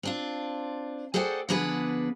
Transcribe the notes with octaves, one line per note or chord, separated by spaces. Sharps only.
C4 D4 F4
G#4 A4 C5 D5 F#5 G5
D3 F3 B3 D4 G#4 B4